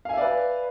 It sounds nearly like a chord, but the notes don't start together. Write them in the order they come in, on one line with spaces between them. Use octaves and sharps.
F5 G#5 E5 D5 B4